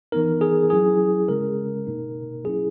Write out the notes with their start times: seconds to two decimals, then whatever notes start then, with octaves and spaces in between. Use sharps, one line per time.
0.12 E3 B3 D#4 A#4
0.41 G#4
0.70 F#3 C#4 E4 G#4
1.28 C#3 G#3 C#4 A#4
1.87 B2 A#3 D#4
2.44 F#3 C#4 E4 G#4